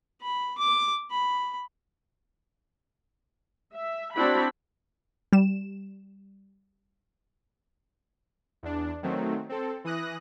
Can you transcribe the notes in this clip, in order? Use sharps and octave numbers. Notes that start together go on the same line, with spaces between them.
B5
D6
B5
E5
C4 D4 E4 F#4 B5
G3 E7
E2 D4
D#3 F#3 A3 C4
C4 A4
E3 D#6 F#6 A#6